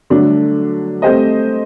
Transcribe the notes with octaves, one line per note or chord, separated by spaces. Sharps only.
D3 F#3 A3 D4
A3 C4 G4 C5 D#5